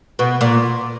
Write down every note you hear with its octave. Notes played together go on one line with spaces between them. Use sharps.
B2
A#2